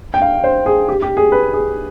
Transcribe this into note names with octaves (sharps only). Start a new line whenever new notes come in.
G5
F5
C5
G#4
G4
G4
G#4
B4
G#4